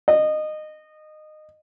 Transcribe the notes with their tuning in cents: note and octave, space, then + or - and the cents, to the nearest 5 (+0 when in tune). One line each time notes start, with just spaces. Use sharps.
D#5 -20